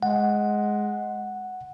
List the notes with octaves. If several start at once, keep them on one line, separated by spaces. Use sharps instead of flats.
G#3 F#5